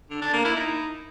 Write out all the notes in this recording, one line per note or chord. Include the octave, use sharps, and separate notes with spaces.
D3
D4
A#3
E4
D#4